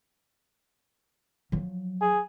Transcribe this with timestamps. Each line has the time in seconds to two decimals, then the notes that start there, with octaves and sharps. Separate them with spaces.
1.52 F3 F#3
2.02 G#4